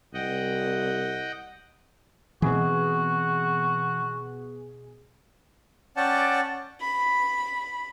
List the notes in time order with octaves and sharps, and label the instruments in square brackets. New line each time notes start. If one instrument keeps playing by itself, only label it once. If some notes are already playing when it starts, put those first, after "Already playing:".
[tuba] C2 [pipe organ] D#5 F#5 G5
[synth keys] B2 G#4 [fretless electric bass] E3 C4 [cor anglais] F#4
[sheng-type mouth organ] C#4 D5 F#5 G5 A5
[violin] B5